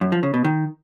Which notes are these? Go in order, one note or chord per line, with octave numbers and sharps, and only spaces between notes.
F#2
F3
C#3
B2
D#3